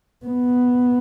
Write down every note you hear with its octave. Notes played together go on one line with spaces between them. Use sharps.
B3